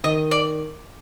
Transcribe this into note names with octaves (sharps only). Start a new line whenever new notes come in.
D#3 D#5
D5